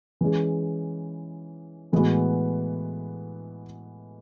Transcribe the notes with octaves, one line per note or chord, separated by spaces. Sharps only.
E3 G#3 C#4 G#4
A2 E3 G#3 B3 F#4